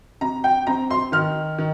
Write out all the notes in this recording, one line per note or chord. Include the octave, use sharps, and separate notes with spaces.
C3 A#5
G5
C4 A#5
C6
D#3 F6
D#3